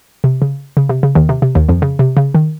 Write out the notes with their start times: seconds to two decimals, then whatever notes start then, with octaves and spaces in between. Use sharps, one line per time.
0.24 C3
0.42 C#3
0.77 C#3
0.89 C3
1.03 C#3
1.15 D#2 D#3
1.29 C3
1.42 C3
1.55 D#2 D#3
1.69 F2 F3
1.82 C#3
1.99 C3
2.17 C#3
2.35 D#3